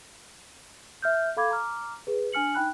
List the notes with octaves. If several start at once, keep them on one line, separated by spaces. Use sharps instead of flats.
E5 F6 G6
A4 F5 B5 D6 G#6
A#5 D6 F6
G#4 B4
D4 G#5 F6 C#7 F#7
D#4 G5 B5 F#6